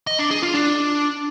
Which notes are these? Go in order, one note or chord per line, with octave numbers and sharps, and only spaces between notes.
D#5
D4
G#4
F4
D4